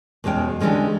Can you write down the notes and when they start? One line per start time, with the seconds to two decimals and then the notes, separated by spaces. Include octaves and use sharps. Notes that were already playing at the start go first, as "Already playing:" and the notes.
0.24 E2 B2 G#3 C#4 G5
0.60 D3 E3 F#3 G#3 C#4 G4